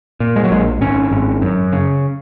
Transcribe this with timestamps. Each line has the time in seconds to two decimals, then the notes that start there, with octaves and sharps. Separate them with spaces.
0.20 A#2
0.36 G#3
0.44 F#3
0.51 A#1 G#3
0.81 G#1 C#4
1.11 G#1
1.42 F#2
1.72 C#3